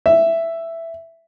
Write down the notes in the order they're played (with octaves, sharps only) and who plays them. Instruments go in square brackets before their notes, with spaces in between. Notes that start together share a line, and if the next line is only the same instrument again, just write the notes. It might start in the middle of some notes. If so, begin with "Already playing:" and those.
[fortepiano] E5